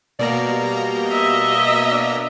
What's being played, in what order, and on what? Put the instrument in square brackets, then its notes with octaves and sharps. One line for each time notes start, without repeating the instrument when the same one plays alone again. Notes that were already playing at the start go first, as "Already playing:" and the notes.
[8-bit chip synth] B2 A#3 A#5 [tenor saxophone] D5
[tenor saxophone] G3
[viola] D#5 E5
[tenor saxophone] D4